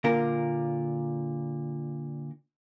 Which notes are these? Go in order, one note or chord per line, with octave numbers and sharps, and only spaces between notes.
A#2 D3 F4 A#4 A#5